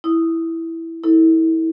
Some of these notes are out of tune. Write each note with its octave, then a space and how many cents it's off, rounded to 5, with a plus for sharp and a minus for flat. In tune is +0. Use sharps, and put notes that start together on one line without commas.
E4 +0 D#6 +0
E4 -30 A4 +15